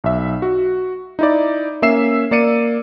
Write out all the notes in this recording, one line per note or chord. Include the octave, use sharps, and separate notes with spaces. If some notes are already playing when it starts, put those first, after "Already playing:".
B1 E5
F#4
D#4 E4 D5
A#3 C#4 E5 E6 C7 E7
A#3 D5 C#7 D#7